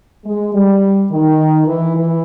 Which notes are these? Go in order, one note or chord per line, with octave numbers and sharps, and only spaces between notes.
G#3
G3
D#3
E3
E3